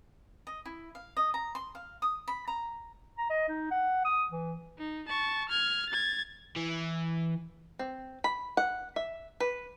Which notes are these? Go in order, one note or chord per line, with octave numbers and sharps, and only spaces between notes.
D#5
E4
F5
D#5
A#5
C6
F5
D#6
B5
A#5
A#5
D#5
D#4
F#5
D#6
E3
D#4
A5 C#6
F6 G#6
G#6 A6
E3
C4
B5
F#5
E5
B4